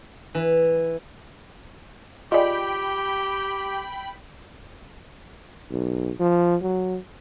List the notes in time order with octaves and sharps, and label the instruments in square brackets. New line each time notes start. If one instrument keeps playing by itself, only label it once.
[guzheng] E3
[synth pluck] F4 G#4 [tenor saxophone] G4 [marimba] D5 D#5 [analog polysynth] G5 B5
[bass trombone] B1
F3
F#3